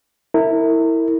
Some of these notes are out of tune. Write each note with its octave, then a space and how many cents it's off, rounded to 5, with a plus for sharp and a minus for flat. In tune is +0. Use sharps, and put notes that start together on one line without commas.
E4 -15 A#4 -35